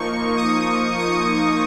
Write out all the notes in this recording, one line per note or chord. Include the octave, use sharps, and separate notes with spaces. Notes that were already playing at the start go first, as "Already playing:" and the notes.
Already playing: F3 A#3 D#4 C#6
D#6
D#6